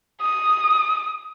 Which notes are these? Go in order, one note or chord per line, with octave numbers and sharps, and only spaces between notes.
D#6